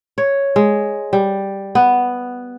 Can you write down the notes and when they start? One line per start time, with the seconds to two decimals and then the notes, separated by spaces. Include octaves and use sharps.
0.18 C#5
0.56 G#3
1.13 G3
1.75 B3